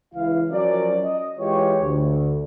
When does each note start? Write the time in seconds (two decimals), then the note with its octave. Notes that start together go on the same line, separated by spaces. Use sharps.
0.14 C#2 E3 E4 F5
0.50 F3 F#3 C#4 A#4 D5
1.03 D#5
1.38 E3 G#3 F4 G4 C#5
1.81 D2